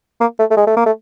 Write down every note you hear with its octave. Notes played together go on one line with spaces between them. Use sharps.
A#3
A3
A3
G#3
A3
A#3
A3